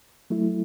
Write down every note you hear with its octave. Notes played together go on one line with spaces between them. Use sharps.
F#3 A3 E4